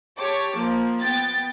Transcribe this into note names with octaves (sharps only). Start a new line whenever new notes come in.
G4 C#5 A5 D6
F3 A#3
B3 G5 A6